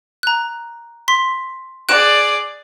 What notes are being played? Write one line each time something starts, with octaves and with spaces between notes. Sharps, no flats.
A#5 F#6
C6 B6
G#4 D5 F#6 D7 E7